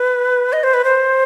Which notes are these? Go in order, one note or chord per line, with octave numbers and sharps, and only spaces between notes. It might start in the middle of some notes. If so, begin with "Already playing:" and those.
Already playing: B4
D#5
C5
B4
C5